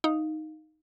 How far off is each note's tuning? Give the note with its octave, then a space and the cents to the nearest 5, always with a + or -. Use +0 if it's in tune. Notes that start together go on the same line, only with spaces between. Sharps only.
D#4 +0 F5 +0